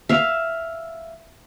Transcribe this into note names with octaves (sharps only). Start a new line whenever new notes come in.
E5 F5